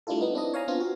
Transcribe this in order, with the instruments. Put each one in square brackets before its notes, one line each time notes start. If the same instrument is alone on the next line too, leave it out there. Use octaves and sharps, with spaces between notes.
[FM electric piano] G3 A3 D4 E4 F4 A4
B3 D#4
C4 D4 E4 D#5
C#5 F5 G#5 A#5
B3 C4 D4 F4
F#4